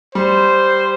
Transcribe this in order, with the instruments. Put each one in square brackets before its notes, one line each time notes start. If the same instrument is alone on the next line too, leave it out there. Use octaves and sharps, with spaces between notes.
[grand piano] G3 [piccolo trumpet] C5